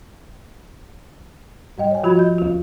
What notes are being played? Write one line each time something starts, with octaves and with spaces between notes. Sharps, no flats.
G#2 G3 D#5 G5
C#5 G#5
F3 F4 F#4 B5 G#6
D#5 G6
D#2 F4